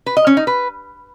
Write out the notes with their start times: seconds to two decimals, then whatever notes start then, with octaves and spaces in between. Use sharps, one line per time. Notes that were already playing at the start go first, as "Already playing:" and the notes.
0.06 B4
0.17 D#5
0.27 C#4
0.37 D#4
0.47 B4